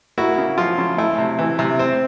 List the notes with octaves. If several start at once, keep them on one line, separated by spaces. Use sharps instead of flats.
A#3 E4 F#4
C#3
F3 F4
C#3
A3 E4
C3
E3
C3
C4